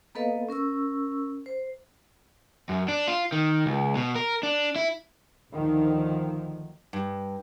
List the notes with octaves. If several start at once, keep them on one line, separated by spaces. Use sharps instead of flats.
A#3 B3 A4 B4 D#5 F5
C#4 A#4 C#6 E6
C5
F#2
D4
F4
D#3
C#2
B2
A#4
D4
E4
D2 D3 D#3 F3
G2